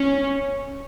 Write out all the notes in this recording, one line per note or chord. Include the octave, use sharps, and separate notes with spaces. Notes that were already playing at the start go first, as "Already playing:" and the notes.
Already playing: C#4